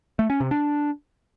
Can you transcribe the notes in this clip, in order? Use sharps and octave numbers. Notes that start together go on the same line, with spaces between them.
A3
C#4
C3
D4